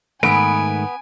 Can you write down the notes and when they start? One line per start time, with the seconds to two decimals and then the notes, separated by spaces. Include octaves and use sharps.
0.23 G#2 D#3 A3 B3 G#5 D7